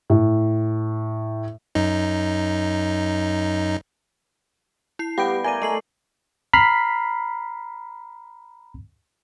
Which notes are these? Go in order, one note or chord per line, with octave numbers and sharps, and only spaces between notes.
A2
F#2 D#4
E4 C7
G3 B3 G4 F5 G6 D7
A#4 D5 E5 G#5 A#5 D#7
A3 D#5 C7 F#7
A#5 B5 F6 B6 C7